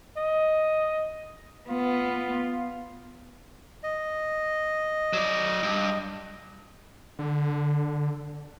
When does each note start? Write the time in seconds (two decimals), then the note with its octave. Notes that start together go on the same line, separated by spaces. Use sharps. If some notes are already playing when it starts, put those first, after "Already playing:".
0.17 D#5
1.70 B3 F4
3.83 D#5
5.13 F#3 D5
5.63 G2
7.19 D3